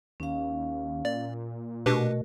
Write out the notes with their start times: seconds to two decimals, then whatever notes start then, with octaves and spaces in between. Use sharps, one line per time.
0.20 D#2 C#4 F5
1.05 A#2 D5
1.86 B2 A3 D4 F#4 G4 A#4 B4